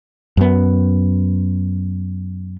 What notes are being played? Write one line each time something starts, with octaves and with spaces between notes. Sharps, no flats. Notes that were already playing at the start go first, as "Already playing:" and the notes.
F#2 B3